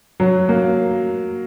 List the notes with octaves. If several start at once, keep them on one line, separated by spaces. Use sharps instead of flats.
F#3
A#3